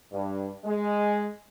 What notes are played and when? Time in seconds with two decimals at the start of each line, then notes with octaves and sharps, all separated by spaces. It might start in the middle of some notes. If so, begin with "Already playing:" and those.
0.12 G2
0.64 G#3